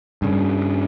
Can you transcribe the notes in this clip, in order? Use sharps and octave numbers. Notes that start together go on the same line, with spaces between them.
G2 C#3